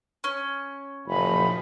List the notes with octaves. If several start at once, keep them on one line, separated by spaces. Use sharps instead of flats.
C#4
F#1 A#2 F3 D#4 B5